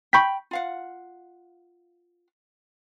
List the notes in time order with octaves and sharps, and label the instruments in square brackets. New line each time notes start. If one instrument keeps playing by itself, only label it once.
[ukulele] G5 B5 [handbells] C#6 G6 B6
[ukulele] F4 F5 F#5